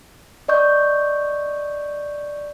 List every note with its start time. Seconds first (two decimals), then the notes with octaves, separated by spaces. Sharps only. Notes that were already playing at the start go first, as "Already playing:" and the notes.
0.48 D5 D#5 C#6 G6